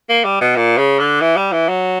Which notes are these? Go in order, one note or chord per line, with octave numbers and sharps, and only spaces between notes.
A#3
G3
B2
A#2
C#3
D3
E3
G3
E3
F#3